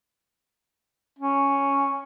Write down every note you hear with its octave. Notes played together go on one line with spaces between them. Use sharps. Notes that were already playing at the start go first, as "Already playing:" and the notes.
C#4